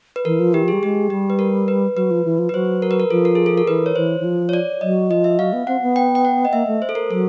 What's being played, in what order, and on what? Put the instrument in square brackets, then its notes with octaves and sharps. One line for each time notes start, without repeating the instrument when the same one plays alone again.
[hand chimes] B4
[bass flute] E3 [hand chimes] A#4
[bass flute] F3
[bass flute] E3 [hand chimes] G4
[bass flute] F3
[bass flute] G3 [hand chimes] G#4
[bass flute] G#3 [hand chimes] G4
[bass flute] G3 [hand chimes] G4
[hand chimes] B4
A#4
B4
[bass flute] F#3 [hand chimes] B4
[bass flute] F3
E3
F3
[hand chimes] B4
[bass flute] F#3 [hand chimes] C5
[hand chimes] A#4
B4
A#4
[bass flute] F3 [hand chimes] A4
[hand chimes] A#4
G#4
A4
A#4
[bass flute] E3 [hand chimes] B4
[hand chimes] C#5
[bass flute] E3 [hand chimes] C5
[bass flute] E3
F3
[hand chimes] C#5
D5
[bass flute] F#3 [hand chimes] D#5
[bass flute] F3 [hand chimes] D#5
[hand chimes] E5
[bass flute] F#3 [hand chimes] F5
[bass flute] B3
[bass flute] C4 [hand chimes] F#5
[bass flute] B3
[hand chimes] G5
G5
F#5
D#5
[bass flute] A#3 [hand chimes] E5
[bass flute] A3
[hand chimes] C5
A4
A#4
[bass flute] F#3 [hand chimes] A4